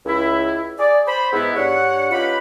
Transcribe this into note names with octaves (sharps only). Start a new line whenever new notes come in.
C#2 E4
G#4 D5
C5 B5
G#2 B3 E4
G2 D3 C#5 F#5
C#4 D#4 F4 G4 B4 B5